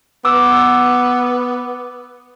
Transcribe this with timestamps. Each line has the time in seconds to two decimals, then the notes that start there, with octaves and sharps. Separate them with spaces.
0.25 B3 D6 E6